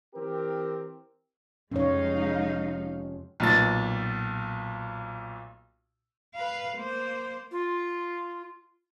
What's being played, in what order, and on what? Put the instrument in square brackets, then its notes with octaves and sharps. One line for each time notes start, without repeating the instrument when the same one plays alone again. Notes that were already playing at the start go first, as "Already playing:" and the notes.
[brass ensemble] E3 C4 G4 A#4
[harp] F1 F2 A#5 [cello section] G#3 D#4 F5 [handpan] C#4 C#5
[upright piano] B1 A#2 A6
[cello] B4 F5
A#3 C5
[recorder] F4